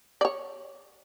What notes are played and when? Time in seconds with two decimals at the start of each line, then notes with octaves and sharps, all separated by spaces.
0.21 C#5 D5